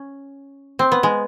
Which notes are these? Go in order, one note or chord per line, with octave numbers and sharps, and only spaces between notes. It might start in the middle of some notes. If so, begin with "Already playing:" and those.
Already playing: C#4
C4
B3
G#3